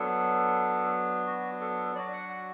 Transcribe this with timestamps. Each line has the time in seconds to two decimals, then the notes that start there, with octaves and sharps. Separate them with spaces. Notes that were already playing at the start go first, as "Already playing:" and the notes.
Already playing: F#3 B3 D4 A4
1.26 F#4
1.61 A4
1.95 F#3 D4 F#4 D5
2.13 F#5
2.29 F#5